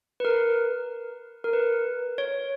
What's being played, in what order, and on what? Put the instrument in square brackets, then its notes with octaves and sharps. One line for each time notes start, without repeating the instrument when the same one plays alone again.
[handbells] B4
A#4
A#4
B4
C#5